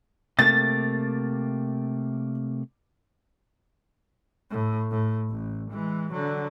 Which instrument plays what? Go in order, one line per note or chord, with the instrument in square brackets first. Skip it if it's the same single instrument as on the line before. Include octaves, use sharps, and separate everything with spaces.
[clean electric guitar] C3 A3 A#3 [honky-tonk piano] A6
[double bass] A2
A2
A1
E3 G#3
D3 F#3